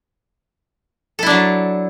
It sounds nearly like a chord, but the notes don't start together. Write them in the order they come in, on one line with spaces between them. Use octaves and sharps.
A4 E4 D4 F#3